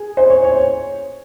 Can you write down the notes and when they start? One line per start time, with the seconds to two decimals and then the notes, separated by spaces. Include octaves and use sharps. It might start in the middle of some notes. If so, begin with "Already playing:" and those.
Already playing: G#4
0.17 C5
0.30 C#5
0.44 C#5